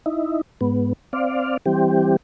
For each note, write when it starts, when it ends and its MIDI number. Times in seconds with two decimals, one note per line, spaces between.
0.06 0.41 63
0.06 0.41 64
0.61 0.93 44
0.61 0.93 59
1.13 1.57 60
1.13 1.57 74
1.13 1.57 77
1.66 2.16 52
1.66 2.16 55
1.66 2.16 60
1.66 2.16 67